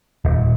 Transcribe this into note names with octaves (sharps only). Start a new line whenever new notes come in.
D#1